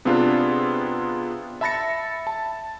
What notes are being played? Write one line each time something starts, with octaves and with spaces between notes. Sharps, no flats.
C3 B3 C4 D4 F4 G#4
E5 A5 B5 A6 A#6 C#7
A5